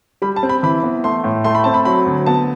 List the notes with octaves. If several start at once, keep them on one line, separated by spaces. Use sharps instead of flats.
G3 B5
A5
C4
B5
E3 B5
B3
A3 C6
A2
A3 C6
B5
C4 A5
B5
F#3 B5
D2
B3 A5